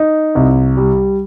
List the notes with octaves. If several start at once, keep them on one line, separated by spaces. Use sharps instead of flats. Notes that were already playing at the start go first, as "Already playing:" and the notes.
Already playing: D#4
C2
G3